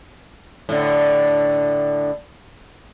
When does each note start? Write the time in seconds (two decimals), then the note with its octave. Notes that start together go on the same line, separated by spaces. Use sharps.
0.69 A2 D3